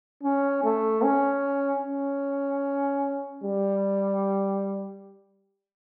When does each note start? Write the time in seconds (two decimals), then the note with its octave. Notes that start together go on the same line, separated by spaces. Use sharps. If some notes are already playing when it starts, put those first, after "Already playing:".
0.23 C#4
0.64 A3
1.03 C#4
1.83 C#4
3.44 G3